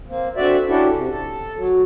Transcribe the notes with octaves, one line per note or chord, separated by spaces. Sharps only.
A#3 C4
D3 C4 F#4 D5 E5
C#4 D4 E4 F#4 G4 A4
C3
A4
F#3